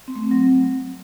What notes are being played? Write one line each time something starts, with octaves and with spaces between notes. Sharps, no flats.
C4
A3
C4
F#3